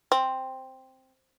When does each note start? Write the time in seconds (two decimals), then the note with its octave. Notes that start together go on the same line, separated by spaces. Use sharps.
0.12 C4